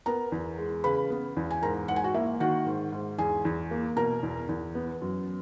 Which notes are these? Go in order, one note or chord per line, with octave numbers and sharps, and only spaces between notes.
B3 A#4 A#5
E2
G#3
C#3 B4 B5
B3
E2
G#5
G#2 A#4 A#5
G#2 F#5
G#5
F#4 F#5
A#3 E4 E5
D#3 F#4 F#5
G#2
G#2
E2 G#4 G#5
E2
A#3
B2 A#4 A#5
E2
E2
B3
F#2